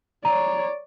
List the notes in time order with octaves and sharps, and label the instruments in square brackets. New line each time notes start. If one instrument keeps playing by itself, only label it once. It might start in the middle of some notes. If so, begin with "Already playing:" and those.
[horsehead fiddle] C#5 D5 [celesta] A#5